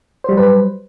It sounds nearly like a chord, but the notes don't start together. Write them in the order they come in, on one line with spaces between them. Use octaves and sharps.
C5 G3 F#3 B4